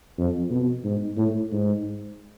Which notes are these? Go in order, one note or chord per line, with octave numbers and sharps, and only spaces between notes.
F2
B2
G#2
A2
G#2